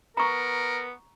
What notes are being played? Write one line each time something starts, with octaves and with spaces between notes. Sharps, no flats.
B3 A#4 A#5 C#6